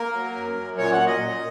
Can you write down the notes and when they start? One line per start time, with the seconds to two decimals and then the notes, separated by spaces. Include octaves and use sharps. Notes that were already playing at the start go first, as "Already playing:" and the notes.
Already playing: A#3 A#4
0.14 F#3
0.35 F#2
0.57 F#2
0.78 A#2 C#5
0.92 F#5
1.00 A#2
1.06 D#5
1.21 A#2